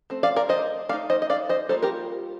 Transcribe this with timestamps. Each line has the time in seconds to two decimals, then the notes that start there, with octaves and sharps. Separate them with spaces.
0.10 A3 C4
0.23 D5 F5
0.36 A#4 D5
0.49 C5 D#5
0.89 A3 D5 F5
0.93 D#4
1.10 C5 D#5
1.22 D#5
1.30 D5 F5
1.49 C5 D#5
1.69 G3 A#3 F4 A4 C5
1.82 G4 A#4